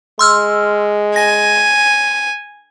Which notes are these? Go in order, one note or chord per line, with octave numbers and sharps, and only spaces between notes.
G#3 C6 E6 F6
G#5 A#6